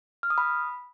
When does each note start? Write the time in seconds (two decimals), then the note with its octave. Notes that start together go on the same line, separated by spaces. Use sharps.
0.23 F6
0.30 D#6
0.38 B5